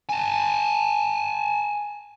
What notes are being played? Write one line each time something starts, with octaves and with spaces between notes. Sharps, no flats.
G#5 A5